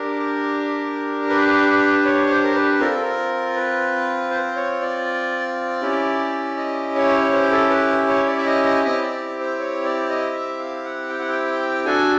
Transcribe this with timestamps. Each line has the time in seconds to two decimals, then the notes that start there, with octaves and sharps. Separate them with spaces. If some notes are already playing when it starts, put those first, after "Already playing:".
Already playing: D4 G4 A#4
1.30 B4
2.05 C#5
2.30 C5
2.44 A#4
2.55 B4
2.80 C4 F4 A4 A#4
2.91 A4
3.01 A#4
3.55 B4
4.31 C5
4.56 C#5
4.81 D5
5.82 C#4 E4 G4
6.57 D#5
6.95 C#5
7.32 C5
7.51 A4
7.70 B4
8.08 C#5
8.26 D5
8.37 E5
8.45 D#5
8.64 D#5
8.83 C4 E4 G4 D#5
9.02 D5
9.40 C5
9.59 C#5
9.84 D5
10.09 D#5
10.34 E5
10.59 F5
10.84 F#5
11.09 G5
11.19 F#5
11.29 G5
11.85 D4 F#4 A4 G#5